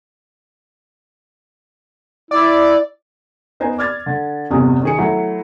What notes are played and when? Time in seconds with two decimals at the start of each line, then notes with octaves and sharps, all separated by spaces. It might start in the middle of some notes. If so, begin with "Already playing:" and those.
2.31 E4 D5
3.60 B3 D#4 A#4 C5 G#5
3.78 D5 D6 F6 G#6 A6
4.06 D3
4.51 G1 E2 C3 G#5 D#6
4.83 D#3 G#4 C#7
4.98 F#3 A3 E4